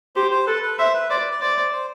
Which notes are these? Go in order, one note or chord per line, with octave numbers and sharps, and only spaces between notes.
G4 C5
C5
A4 B4
B4
C5 E5
B4
C5 D5
B4
D5
C5 D5
C5
C5